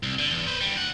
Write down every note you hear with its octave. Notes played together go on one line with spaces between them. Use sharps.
C2
D3
E2
B4 C5
D3 G3
D2 F#5